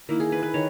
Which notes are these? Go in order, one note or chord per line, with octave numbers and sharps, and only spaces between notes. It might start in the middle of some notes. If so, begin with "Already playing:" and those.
D#3 A#3 E4
G#4
B4
B4
D#3 C#5